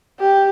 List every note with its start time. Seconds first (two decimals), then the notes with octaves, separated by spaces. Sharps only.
0.20 G4